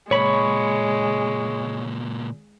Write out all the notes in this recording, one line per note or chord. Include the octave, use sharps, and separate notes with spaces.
C#2 A#2 G#3 C#5 B5